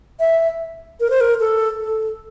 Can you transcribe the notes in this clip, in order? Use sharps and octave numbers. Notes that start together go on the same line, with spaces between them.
E5
A#4
C5
A#4
A4
A4